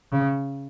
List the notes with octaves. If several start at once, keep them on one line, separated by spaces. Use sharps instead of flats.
C#3